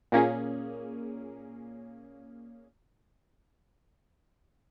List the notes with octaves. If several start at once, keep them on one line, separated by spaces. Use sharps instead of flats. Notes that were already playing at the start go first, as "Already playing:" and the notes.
A#2 A#3 C#4 G#4